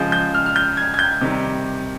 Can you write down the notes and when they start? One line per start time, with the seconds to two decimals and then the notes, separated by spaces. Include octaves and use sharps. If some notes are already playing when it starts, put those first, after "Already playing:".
Already playing: C#3 F3 G#3 G6
0.12 G6
0.34 F6
0.46 F6
0.56 G6
0.77 G#6
0.94 G#6
0.99 G6
1.21 C3 D#3 G3